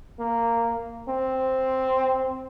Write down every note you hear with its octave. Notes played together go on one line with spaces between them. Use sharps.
A#3
C4